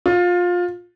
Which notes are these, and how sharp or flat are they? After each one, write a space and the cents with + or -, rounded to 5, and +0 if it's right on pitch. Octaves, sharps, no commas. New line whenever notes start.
F4 +20